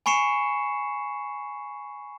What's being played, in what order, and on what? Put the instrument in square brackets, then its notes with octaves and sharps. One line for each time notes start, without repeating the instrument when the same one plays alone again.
[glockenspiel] G#5 B5 C#6 C7 C#7 E7